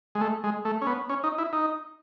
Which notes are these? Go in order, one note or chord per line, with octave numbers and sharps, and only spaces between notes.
G#3
A3
G#3
A3
C#4
B3
C#4
D#4
E4
D#4